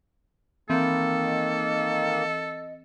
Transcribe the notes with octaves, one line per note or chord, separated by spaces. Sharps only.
D#3 E3 A#3 C4 A4
D#5